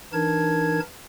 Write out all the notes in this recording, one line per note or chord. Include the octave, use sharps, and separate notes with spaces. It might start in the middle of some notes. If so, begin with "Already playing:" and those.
E3 D4 D#4 A#4 A5 G#6